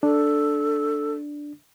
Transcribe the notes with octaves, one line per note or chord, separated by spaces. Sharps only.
D4 A4